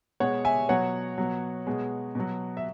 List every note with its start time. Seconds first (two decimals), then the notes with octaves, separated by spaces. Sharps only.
0.20 B2 G#3 C#5 F#5
0.45 E5 G#5
0.69 B2 F#3 C#5 F#5
1.18 B2 F#3
1.67 B2 G#3
2.15 B2 F#3
2.57 E5